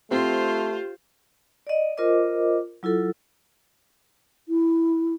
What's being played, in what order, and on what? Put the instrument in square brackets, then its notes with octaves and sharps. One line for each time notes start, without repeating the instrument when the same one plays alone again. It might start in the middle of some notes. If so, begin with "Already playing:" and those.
[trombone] A3 [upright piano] C4 [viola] F4 C5 [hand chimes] G4
[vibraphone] D5 D#5
F4 A#4 C5 D#5 D6
F#3 E4 F4 A4
[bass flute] E4